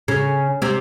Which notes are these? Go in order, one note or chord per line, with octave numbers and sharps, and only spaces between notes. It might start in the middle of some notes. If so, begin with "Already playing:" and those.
C#3 C#4
C3 C4